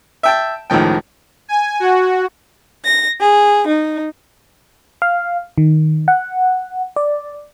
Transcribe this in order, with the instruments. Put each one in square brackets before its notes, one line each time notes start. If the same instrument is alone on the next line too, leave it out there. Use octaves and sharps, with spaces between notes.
[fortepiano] E5 G5 A5
C#2 A2 D#3 F3 G5
[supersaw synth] G#5
F#4
[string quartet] A#6
G#4
D#4
[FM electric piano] F5
D#3
F#5
D5